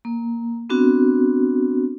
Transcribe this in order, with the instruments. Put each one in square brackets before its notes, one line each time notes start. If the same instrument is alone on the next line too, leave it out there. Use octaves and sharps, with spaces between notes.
[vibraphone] A#3
B3 C4 D4 F#4